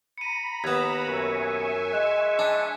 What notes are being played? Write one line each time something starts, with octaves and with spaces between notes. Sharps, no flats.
A#5 B5 C#7 D#7
D#2 B3 G#6 E7
F#2 E5 G#5 C#6 F#6
G#3 F#6 E7
D4